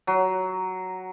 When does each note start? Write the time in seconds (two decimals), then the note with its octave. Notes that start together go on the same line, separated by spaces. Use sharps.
0.07 F#3